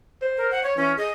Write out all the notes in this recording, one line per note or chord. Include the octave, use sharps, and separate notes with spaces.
C5
A#4
F#5
C#5
E3 C#4
G#4 D#5